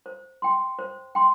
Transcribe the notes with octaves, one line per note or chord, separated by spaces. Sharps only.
C5
G5 C6
C5
G5 C6